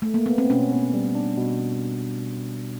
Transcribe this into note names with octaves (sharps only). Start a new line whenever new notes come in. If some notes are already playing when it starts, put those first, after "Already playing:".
A3
A#3
B3
C4
B2 C#4
B3
G3
D4
B2